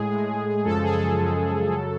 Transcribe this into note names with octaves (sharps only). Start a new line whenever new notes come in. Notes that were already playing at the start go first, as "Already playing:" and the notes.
Already playing: A2 G#3 G#4
A2 G#3
F#2 C#3 F3 G#3 A4
G#4
A4
F#2 C#3 F3 G#3
F#2 C#3 F#3